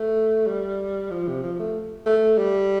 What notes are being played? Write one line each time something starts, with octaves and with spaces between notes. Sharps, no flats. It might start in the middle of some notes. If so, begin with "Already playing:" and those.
Already playing: A3
G3
F3
C3
F3
A3
A3
G3